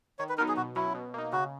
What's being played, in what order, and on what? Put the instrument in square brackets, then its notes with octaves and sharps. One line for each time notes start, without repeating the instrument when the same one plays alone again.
[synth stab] D#3 [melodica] C#5
[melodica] B4
[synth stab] F#3 B3 D#4 [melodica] A#4
[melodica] G#4
[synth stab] B2 [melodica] F#4
[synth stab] F#3 C#4 [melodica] E4
[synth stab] B2
A#3 D#4
[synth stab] C#3 [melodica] F#4